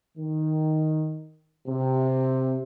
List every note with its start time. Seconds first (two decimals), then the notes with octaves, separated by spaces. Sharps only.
0.17 D#3
1.68 C3